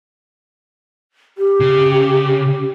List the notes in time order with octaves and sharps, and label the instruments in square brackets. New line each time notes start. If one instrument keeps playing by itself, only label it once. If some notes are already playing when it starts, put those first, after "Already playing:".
[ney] G4
[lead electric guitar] C#3